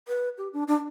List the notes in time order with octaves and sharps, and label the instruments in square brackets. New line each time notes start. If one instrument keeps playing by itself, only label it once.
[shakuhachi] B4
G4
D4
D4